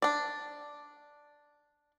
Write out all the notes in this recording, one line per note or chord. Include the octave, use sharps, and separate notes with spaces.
D4 D5